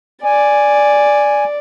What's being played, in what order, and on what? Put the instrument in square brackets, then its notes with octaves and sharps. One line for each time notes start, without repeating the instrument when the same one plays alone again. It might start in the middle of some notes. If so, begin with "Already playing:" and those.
[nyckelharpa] D5 [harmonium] G#5